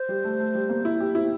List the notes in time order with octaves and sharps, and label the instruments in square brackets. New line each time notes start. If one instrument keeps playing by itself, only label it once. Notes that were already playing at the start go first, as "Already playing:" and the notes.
Already playing: [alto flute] C5
[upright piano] G3
A3
A3
G3
A#3
E4
G4
E4